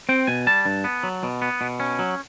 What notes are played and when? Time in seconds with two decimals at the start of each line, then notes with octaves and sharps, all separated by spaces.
0.09 C4 G5
0.27 B2 G#5
0.47 G3 A5
0.66 G2
0.84 B3
1.03 F#3
1.23 B2
1.42 B3
1.61 B2
1.80 C#4
1.99 F#3